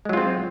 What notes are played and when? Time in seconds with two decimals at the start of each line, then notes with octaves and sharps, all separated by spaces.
0.05 G#3
0.09 F#3
0.13 F4
0.17 C4